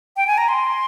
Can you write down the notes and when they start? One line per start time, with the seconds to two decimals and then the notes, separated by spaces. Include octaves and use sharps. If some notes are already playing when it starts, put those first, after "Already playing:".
0.17 G5
0.27 G#5
0.38 A#5
0.49 C6